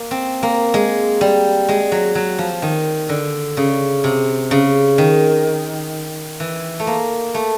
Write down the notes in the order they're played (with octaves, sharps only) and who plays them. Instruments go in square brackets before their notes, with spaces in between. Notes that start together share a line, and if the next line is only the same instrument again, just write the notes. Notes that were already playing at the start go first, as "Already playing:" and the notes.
Already playing: [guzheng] A#3
C4
A#3
G#3
G3
G#3
F#3
F#3
F3
D#3
D3
C#3
C3
C#3
D#3
E3
A3
A#3
A3